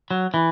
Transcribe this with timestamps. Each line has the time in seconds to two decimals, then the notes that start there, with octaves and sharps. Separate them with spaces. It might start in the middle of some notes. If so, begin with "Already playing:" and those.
0.11 F#3
0.34 E3